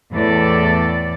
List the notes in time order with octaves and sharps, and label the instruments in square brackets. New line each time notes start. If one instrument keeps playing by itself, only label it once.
[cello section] E2 A2 A4 D5